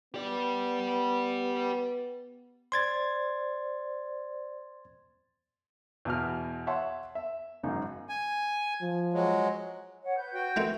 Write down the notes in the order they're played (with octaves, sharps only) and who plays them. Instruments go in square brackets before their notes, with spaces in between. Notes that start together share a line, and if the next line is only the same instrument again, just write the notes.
[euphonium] B3 [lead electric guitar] G4 D5
[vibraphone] C5 D5 [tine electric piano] C6 G#6 A6
[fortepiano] E2 B2 F6
C#5 E5 F#5 A5 C6
E5
G#1 F#2 C#3 D#4
[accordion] G#5
[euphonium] F3
[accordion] F#3 G#3
[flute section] C#5 F#5
B4 G6
[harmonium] F#4 G5
[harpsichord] D#3 A3 C4